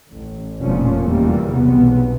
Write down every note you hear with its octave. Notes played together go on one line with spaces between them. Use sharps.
A1
F1 A#2 F3 C#4
E2 D#3 E3 G3 A#3
B1 E2 C3 B3